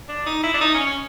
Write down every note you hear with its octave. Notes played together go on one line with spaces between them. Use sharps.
D4
D#4
E4
D4
D#4
C#4
C#4